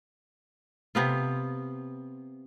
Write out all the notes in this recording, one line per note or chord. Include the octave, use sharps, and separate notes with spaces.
C3 B3 F4